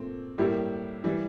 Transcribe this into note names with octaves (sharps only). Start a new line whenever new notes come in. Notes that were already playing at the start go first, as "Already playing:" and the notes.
Already playing: A#2 A3 C4
A2 G3 A#3 E4 G4
E3 G3